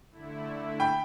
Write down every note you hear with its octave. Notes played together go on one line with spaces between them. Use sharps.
D3 A3 E4
G5 B5